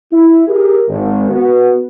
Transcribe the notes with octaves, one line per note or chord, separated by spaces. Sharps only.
E4
G4 G#4 A#4
G#1
B3 F#4